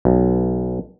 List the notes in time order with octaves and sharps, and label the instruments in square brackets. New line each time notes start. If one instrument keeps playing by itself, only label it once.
[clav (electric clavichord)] B1